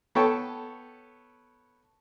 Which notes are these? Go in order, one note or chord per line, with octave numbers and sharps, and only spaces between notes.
B3 A4 C#5 G5 A5